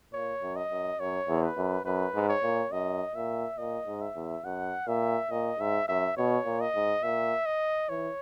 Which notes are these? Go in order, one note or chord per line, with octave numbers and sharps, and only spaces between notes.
A#2 C#5
F#2
D#5
F#2
F#2 C#5
E2
B4
F#2
F#2 B4
G#2
C#5
A#2
F#2 D#5
A#2 E5
A#2 D#5
G#2
E5
E2
F#2 F#5
A#2 E5
A#2 D#5
G#2 E5
F#2 E5
B2 C#5
A#2
D#5
G#2
A#2 E5
D#5
E3 C#5